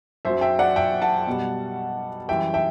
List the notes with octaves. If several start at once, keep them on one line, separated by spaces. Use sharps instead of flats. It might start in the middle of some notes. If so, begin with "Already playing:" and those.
F#2 F#3 C5 E5
E5 G5
D5 F#5
E5 G5
F#5 A5
B2 G3
F#2 E3 G3 E5 G5
E5 G5